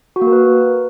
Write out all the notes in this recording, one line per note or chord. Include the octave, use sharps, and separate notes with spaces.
F#4
A#3
A#4
B4